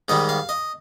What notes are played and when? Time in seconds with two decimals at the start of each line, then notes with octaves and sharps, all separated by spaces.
0.08 G#2 D#3 G3 D#5
0.29 F5
0.49 D#5